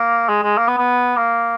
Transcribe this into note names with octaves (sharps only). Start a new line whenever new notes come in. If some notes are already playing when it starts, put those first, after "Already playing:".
Already playing: A#3
G#3
G#3
A#3
B3
B3
A#3